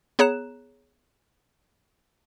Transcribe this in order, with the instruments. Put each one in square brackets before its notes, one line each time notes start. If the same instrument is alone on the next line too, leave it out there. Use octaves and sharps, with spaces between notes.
[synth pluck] B3 G#4 C#5 A#5 F#6 E7